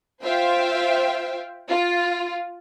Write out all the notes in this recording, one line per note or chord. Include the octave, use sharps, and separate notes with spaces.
F4 C5 E5 F5 G5
F4